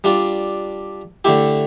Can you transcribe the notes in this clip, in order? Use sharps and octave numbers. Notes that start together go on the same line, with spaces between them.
G3 D4 F4
D3 A3 E4 G4